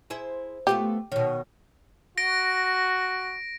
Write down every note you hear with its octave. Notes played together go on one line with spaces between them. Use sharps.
E4 G#4 C5
A3 B3 F4 G4
B2 D#3 C#5
F#4 A#6 D7